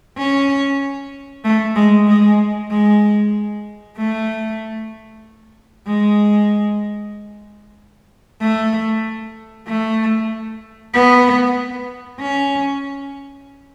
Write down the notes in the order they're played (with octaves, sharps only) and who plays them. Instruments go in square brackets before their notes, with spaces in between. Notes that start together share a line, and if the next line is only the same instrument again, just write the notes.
[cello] C#4
A3
G#3
G#3
G#3
A3
G#3
A3
A3
B3
C#4